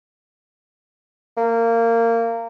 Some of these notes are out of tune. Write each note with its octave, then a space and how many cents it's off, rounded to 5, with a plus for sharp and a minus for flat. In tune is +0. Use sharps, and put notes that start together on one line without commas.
A#3 -20